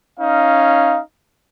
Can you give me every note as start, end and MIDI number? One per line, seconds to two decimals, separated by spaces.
0.20 1.00 61
0.20 1.00 63
0.20 1.00 77